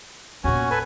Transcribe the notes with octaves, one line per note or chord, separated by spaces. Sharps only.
E2 A#2 C#4 F#4 G#5
A4 B4 G#5